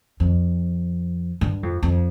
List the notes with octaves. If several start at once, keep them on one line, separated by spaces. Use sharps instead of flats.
F2
G2
F2
F2